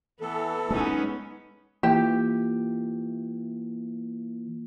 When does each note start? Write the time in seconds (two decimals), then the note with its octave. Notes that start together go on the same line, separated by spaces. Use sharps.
0.21 E3 B3 A4
0.71 G#3 B3 C#4 D#4
1.83 E3 A#3 F4 G4